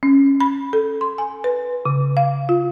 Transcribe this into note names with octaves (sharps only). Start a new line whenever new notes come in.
C#4
B5
A4
C6
G#5
B4
C#3
F5
F4